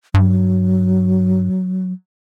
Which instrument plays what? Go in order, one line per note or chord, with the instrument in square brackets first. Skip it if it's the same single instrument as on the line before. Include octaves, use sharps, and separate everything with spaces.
[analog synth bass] G2 [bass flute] F#3